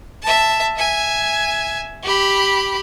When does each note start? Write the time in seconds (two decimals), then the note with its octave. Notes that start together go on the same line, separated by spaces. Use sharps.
0.22 E5 A5
0.76 E5 G#5
2.03 G4 B5